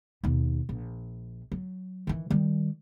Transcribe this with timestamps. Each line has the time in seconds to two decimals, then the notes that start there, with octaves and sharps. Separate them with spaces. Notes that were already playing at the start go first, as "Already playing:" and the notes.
0.24 D#2 B2
0.69 A#1
1.52 F#3
2.07 D#3 E3
2.30 D#3 G3